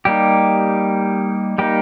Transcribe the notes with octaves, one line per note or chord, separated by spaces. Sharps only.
G3 A#3 D#4 G4
G3 A#3 D#4 G4